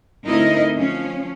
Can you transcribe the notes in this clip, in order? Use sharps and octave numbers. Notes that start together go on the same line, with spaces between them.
D2 C4 D#4 E4 A#4 D#5
F3 C#4